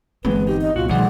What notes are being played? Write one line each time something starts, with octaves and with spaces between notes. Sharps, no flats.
G1 E3 G#3 B3 C4 B4
D#4 G4
D#5
C2 A#2 F4 F#4
B2 D#3 F3 G3 A3 G#4 D5 F#5